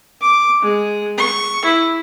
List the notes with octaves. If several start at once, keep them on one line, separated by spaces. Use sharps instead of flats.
D6
G#3
C#6
E4